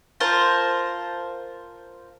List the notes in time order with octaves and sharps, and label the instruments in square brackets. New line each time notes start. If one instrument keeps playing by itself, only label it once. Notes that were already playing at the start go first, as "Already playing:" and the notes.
[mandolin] F4 A#4 C5 A5